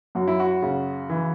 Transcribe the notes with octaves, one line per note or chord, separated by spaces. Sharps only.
F#2 F#4
E4
F#4
C#3
E3